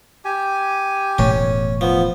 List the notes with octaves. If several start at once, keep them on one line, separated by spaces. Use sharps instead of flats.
G4 G#5
E1 A2 A3 C#4
F3 B3